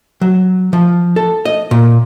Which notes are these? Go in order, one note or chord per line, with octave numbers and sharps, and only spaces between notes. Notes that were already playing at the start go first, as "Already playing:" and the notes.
F#3
F3
A4
D#5
A#2